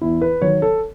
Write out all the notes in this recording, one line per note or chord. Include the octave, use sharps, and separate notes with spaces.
E2 E4
B4
D#3 F#3 C#5
A4